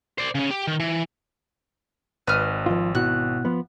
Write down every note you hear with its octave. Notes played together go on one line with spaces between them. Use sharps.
C5 D5
C#3 C#4
G4
D#3
E3
G#1 B4 D#5 F6
F3 F4
B2 E4 F#4 F#6
F3 B3